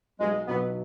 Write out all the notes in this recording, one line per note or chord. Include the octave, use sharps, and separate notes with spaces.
B1 G#3
B2 F#3 B3